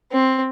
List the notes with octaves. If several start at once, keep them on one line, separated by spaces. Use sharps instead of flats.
C4